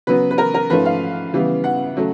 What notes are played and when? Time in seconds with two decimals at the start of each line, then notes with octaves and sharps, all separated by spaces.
0.07 C#3 F#3 B3 B4
0.31 B4
0.38 A#4
0.54 A#4
0.70 G#2 F3 A3 C#4 B4
0.85 F5
1.33 C#3 E3 G3 B3
1.64 F#5
1.95 C#3 F#3 A3